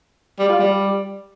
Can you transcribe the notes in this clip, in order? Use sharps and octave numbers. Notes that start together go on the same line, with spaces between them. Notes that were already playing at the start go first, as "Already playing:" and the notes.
G3
F4
G3